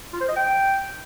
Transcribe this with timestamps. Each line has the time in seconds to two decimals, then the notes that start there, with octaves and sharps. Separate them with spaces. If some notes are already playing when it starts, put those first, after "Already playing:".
0.13 F4
0.21 C5
0.29 D#5
0.36 G5